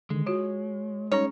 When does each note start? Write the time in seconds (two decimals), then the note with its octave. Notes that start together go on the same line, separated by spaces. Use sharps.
0.10 D3 D#3 G#3
0.27 F4 F#4 C#5
1.12 G3 C#4 D#4 G#4 C#5